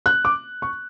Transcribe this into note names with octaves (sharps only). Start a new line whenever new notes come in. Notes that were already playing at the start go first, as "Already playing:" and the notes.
F#6
D6
C#6